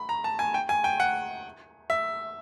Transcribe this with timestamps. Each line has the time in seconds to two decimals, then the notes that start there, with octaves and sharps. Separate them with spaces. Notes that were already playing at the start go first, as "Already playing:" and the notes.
Already playing: B5
0.09 A#5
0.24 A5
0.39 G#5
0.54 G5
0.69 G#5
0.84 G5
1.00 F#5
1.90 E5